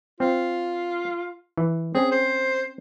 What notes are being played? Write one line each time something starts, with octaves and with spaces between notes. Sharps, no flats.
C4 F4
E3
C4 C#4 G#4
C5